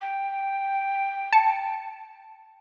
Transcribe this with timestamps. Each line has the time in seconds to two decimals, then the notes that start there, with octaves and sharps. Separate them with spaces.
0.01 G5
1.33 A5 C#7